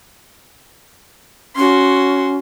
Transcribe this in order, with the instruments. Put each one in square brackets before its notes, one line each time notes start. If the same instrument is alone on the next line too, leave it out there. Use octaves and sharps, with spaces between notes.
[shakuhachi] C#4 [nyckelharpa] F#4 C6